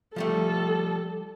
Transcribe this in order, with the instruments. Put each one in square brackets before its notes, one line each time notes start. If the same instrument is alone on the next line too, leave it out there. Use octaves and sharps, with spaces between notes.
[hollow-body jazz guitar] F3 G3 A3 [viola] A4